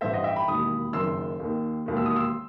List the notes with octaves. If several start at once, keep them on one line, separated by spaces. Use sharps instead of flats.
A1 G2 E3 C5 E5
D#5 F#5
E5 G5
G5 B5
E1 D#2 D#3 B5 D#6
F#1 F#2 D#3 C6 E6
D#2 D#3
E1 D#2 D#3
E6
D#6
C6 E6